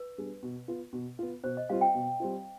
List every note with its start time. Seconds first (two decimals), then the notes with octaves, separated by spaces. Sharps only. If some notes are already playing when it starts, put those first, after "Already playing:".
Already playing: B4
0.18 G3 B3 D4 G#4
0.43 B2
0.68 B3 F4
0.93 B2
1.19 B3 F4
1.44 B2 C5
1.57 D#5
1.69 G3 C4 F4 F5
1.81 G5
1.95 B2
2.20 G3 C4 F4